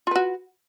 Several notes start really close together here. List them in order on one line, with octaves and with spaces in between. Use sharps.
F4 B4 F#4